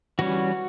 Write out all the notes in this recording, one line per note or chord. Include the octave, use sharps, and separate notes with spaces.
E3 G3 C#4 F#4